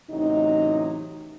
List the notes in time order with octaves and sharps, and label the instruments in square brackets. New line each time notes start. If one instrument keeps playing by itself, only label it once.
[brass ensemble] A1 C3 F#3 D#4